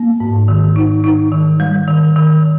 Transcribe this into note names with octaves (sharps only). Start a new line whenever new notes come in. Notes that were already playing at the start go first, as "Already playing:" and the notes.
Already playing: A#3
G#2
D#3
D#4
D#4
D#3
G3
D#3
D#3